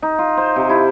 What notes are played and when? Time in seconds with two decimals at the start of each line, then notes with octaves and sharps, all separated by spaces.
0.02 D#4
0.19 F4
0.37 C5
0.56 C3
0.69 E4